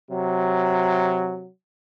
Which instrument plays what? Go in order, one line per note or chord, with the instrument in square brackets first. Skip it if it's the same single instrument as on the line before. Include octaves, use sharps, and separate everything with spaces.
[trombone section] C3 F#3